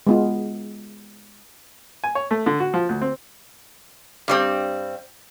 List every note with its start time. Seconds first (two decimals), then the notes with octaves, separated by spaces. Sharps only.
0.07 G#3 B3 F4
2.04 G#5
2.15 C#5
2.31 A3
2.46 D3
2.60 F#4
2.74 F3
2.89 D2
3.02 C4
4.28 G2 G3 C4